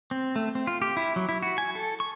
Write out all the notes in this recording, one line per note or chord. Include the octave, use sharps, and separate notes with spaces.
C4
A3
C4
F4
G4
E4
F#3
E4
F#4
G#5
A4
C#6